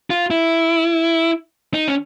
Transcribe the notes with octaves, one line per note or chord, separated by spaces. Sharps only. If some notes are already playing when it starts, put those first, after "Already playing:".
F4
E4
D#4
C#4